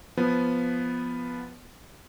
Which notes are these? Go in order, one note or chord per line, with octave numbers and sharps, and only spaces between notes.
F3 B3